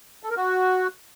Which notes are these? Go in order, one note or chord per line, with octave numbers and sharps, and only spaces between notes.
A4
A#4
F#4